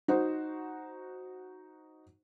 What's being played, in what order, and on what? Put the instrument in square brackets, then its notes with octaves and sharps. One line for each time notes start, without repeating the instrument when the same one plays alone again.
[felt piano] D#4 F#4 C5